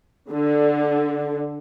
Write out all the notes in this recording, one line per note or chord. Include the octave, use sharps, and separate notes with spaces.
D3